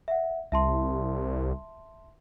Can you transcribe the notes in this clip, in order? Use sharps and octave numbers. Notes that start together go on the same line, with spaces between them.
E5 F#5
C2 E5 A5 C6